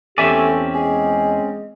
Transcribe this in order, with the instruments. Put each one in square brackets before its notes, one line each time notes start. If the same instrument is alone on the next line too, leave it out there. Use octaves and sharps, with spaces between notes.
[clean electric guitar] E2 E5 G#5 [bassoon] A3 [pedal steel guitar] C4 C#4 D5 [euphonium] G4
[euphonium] G#3 [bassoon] G#4